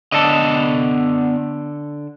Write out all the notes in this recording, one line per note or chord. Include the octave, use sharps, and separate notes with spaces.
D3 B3 A4 D5 D#5